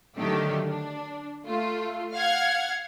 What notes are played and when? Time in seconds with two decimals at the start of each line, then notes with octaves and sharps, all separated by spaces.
0.17 D3 D#3 F#3 A3 G4
0.67 D4
1.45 A3 F4
2.14 F5 F#5 F6 G#6